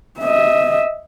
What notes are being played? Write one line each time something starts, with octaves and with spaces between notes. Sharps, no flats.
D#5 E5